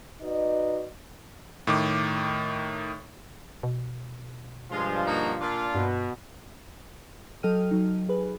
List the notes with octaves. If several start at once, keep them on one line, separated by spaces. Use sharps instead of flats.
D#4 F#4 B4 D5 D#5
A2 D#3 D6
B2
G2 F3 G#3 F4
A#3 D#4 F#4
A#2 D4 F4
G2 B2
F#3 A4 D#5 G5 F6 D#7
F#3 D#4
G#4 B4